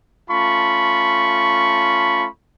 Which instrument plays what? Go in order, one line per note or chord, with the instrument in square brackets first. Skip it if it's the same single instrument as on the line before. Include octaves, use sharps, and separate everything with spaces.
[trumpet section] A3 C#4 F4 A5 B5 C#6